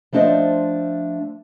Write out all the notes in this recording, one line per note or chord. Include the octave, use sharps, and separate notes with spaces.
F3 A3 D4 C5 D#5